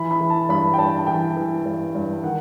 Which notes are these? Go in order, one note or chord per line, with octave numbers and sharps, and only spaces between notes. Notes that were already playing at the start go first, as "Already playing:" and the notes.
Already playing: E3 B5
B5
E3
A5
G2 B5
G5
G2 A5
A5
E3 G5
E3
G2
G2
D#3 F#5